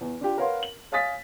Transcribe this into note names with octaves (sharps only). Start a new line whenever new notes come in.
E2
D4 F4 G4
A#4 B4 C#5 F5 F#5 C6
F#7
C#5 F5 G#5 D#6 A6 B6